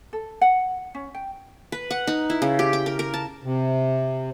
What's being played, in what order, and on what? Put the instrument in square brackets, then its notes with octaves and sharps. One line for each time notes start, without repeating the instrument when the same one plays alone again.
[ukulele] A4
F#5
C#4
G5
[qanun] B4
F#5
D#4
E4
C#3
G4
G5
A#4
A#4
A5
[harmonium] C3